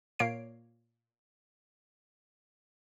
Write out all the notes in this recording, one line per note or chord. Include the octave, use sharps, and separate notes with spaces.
A#2 A#3 C#5 C7 D7